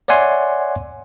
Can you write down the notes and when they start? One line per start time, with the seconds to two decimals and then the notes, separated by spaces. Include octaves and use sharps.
0.08 C#5 D5 E5 F#5 G#5 C6